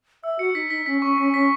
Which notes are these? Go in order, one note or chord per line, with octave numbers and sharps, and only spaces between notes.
E5 E6
F#4 C#7
D#4 B6
D#4 B6
C#4 B6
C#4 C#6
C#4 B6
C#4 B6